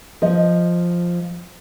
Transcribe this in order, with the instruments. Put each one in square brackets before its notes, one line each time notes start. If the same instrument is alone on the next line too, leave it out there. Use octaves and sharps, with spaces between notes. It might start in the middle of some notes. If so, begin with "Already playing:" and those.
[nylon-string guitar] F3 D#5